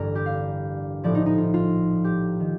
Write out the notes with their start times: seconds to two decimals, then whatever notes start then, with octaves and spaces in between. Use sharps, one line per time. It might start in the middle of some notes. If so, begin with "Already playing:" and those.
Already playing: A1 G2 D3 A#4
0.15 G4
0.26 F5
1.03 A#1 A2 F3 D5
1.15 D#4
1.26 D#4
1.38 F4
1.54 F4
2.04 G4
2.40 D#3